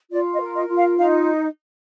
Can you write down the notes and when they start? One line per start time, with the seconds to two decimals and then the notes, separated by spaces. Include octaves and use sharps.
0.12 F4 D5
0.33 D#5
0.41 A#4
0.55 D#5
0.69 F4
0.77 F5
0.98 D#4 F5